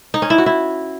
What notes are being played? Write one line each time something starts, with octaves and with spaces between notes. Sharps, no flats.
D#4
C#4
E4
F#4
E4